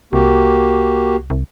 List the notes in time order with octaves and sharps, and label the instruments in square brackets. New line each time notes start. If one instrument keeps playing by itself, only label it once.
[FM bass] C2 [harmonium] A#3 F#4 G4
[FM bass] C2